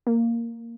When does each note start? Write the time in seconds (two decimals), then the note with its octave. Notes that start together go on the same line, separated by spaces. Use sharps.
0.07 A#3